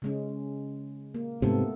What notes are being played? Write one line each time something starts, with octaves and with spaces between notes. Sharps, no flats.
C#3 G#3 C#4
A#3
G#2 C3 A3 B3 A4